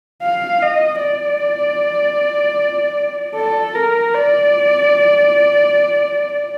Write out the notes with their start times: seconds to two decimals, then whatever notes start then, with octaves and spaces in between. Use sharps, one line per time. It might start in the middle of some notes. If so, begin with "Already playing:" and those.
0.23 F5
0.62 D#5
1.01 D5
3.35 A4
3.75 A#4
4.14 D5